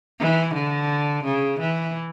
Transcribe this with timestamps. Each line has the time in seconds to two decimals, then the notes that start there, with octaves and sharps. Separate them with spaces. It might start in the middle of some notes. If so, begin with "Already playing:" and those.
0.19 E3
0.54 D3
1.24 C#3
1.60 E3